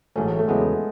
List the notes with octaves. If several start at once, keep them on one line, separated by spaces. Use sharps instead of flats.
A1 G#2 F#3 A3 C#4
A3
E2 C#3 F#3 G#3 B3 E4